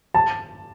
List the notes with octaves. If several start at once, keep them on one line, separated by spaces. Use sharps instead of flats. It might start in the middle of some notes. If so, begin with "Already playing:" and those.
A5